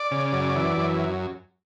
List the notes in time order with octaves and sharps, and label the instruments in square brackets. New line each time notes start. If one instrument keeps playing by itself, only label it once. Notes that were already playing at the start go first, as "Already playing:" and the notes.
Already playing: [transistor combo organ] D5
C#3
F#2
E3
F#2